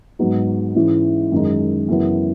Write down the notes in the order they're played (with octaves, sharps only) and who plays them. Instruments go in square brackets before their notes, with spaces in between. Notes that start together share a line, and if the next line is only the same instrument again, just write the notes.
[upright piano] G#2 F#3 B3 D#4
G#2 E3 G#3 C#4 E4
F#2 D#3 G#3 D#4
F#2 C#3 E3 B3 E4